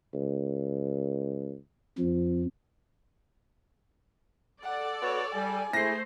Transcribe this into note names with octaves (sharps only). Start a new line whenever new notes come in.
C#2
F2 F3
A4 D5 F#5
B3 F#4 C#5 E6
G3 G#5
A3 E4 G#4 C5 A#6 C7